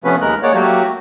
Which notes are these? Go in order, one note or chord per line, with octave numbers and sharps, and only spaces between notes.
C3 F3 A3 B3 C#4 B4
D#2 G#3 A#4 F#6
G#3 A#3 C#5 D5 F#5
F#3 A3 A#3 F#4 G4